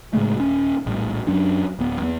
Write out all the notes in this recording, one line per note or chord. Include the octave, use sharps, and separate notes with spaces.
A2 C#3 G#3 A3
D#1 C#4
A#1 A2 G3
F#2 F#3 C#4 D4
D1 B3
E2 G2 B3